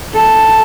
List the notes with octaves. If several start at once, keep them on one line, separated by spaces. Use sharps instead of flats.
A4